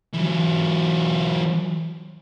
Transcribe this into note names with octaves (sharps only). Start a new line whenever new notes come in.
E3 F#3